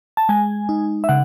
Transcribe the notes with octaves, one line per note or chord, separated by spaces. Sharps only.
A5
G#3 G#5
D#4
E5
C#3 F#5